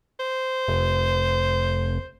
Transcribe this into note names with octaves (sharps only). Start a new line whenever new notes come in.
C5
F1